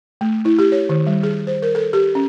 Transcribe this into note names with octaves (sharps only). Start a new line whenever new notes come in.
A3
E4
G4
C#5
D#3
G3
G#4
C5
A#4
A4
G4
C#4